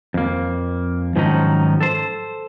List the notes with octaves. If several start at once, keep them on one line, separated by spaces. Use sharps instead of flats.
F2 A#3
G#2 D#3 F3 F#3 C#4 D#4
A4 C5